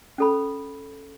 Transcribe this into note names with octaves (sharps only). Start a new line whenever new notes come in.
C#4 A4 B5